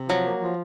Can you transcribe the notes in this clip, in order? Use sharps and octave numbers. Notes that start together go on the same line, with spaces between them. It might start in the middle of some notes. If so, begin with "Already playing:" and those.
Already playing: C3
F3 F#3
A#3
F3